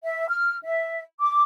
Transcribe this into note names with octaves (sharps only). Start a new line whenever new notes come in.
E5
F6
E5
D6